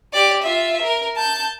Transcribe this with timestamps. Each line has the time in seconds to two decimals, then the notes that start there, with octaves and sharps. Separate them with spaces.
0.13 G4 D5
0.42 F4 E5
0.82 A#4
1.16 A5 G6